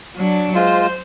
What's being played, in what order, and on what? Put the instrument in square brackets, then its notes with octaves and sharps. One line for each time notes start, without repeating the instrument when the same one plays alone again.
[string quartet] F#3 D4
[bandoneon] G#3 F4 [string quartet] C5